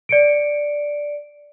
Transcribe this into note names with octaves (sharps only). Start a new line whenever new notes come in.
D5 C#7 D7